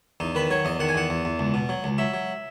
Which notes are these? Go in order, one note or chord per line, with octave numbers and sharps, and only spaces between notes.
E2 D#4
D#3 B4
F#3 C#5
E2 D#5
D#3 F#5
G#5
E2 F#5
E2
E2
C#2
B2
F#3
C#2
F#3 E5
F#3